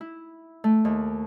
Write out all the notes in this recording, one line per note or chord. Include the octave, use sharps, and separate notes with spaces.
E4
A3
D#2